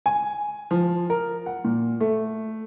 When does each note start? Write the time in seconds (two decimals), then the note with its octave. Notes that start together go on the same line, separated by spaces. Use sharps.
0.06 G#5
0.71 F3
1.10 A#4
1.46 F#5
1.64 A#2
2.00 A3